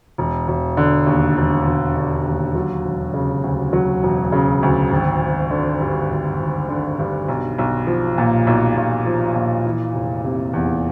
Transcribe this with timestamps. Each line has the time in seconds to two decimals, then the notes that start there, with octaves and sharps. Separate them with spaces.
0.18 E1
0.48 E1
0.77 D3
1.06 D#2
1.37 E1
1.67 E1
1.96 D3
2.26 D#2
2.55 F#3
2.85 E1
3.14 C#3
3.44 D2
3.73 F#3
4.03 E1
4.32 C#3
4.63 D2
4.91 G#1
5.22 G#1
5.50 D3
5.81 G2
6.10 G#1
6.40 G#1
6.69 D3
6.99 G2
7.28 B1
7.58 B1
7.87 F3
8.18 A#2
8.47 B1
8.77 B1
9.06 F3
9.36 A#2
9.66 E3
9.95 F1
10.24 C3
10.53 E2